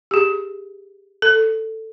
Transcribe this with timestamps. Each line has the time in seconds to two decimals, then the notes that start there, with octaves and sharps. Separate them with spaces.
0.11 G4 G#4
1.22 A4